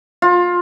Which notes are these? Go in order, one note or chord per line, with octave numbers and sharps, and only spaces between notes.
F4